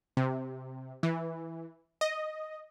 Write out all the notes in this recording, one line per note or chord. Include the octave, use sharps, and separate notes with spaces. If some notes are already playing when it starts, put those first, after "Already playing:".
C3
E3
D#5